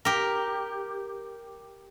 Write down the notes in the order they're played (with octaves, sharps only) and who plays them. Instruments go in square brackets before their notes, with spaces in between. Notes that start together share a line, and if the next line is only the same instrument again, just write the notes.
[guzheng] G4 A#4